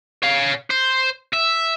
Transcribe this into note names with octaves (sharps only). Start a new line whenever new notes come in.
C#5 F5
C5
E5